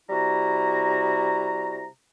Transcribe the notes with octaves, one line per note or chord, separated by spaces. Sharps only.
C3 G3 E4 F#4 A#5